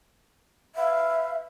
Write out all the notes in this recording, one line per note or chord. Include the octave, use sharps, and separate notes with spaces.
B4 E5 F5